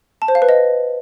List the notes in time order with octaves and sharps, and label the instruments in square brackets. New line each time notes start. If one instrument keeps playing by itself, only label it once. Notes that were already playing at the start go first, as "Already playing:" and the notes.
[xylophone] A5
C5
F5
B4
D#5